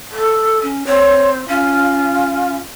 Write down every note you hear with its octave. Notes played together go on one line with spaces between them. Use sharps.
A4
C#4
C4 C#5
C#4 F4